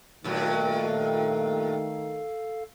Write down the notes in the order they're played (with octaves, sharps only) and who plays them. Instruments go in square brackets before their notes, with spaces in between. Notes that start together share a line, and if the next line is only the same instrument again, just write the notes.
[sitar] G2 A#2 F#3 [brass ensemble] D#3 A3
[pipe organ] A4 F5